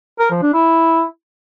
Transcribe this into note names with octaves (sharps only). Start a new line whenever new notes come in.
A#4
F3
D4
E4